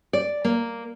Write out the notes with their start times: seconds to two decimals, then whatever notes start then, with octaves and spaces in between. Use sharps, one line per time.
0.13 D5
0.44 A#3